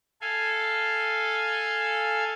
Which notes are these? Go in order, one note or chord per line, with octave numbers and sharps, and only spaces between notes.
A4 F5 G#5